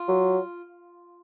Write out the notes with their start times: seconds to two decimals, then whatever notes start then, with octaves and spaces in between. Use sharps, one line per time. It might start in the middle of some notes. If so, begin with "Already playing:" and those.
Already playing: F4
0.08 F#3